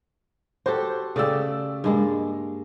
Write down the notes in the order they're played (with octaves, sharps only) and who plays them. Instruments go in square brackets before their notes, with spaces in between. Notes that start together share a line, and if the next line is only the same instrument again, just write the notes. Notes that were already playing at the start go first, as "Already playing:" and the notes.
[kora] F#4 G4 A4 [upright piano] C5
[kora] C#3 G4 [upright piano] A3 D5 E6
[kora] G2 G#3 A#3